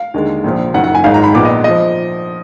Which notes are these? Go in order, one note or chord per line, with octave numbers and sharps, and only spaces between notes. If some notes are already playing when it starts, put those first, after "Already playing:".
Already playing: F5
D#2 D3 G#3
A#1 A#2 F3
F#1 F#2 D#3 F#5
F#5
G#5
G#1 G#2 D#3 G#3 F5
A#5
B5
A#1 A#2 G#3 B3 D6
D#5
F3 D#5